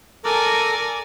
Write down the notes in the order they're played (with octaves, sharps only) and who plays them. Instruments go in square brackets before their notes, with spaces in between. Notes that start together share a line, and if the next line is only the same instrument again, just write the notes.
[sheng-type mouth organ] A4 A#4 A#5 [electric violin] D5 G#5